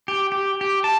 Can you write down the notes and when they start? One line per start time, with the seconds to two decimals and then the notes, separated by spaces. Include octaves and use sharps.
0.08 G4
0.32 G4
0.61 G4
0.84 A5